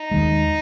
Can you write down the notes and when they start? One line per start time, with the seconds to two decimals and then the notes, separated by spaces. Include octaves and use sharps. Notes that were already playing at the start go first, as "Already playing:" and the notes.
Already playing: D#4
0.11 D#2 D#3 G#3